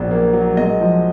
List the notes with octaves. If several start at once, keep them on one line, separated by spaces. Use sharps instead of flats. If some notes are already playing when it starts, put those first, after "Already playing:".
Already playing: A#1 A#2 F#3
A#3
F#3
G#3 D#5
F3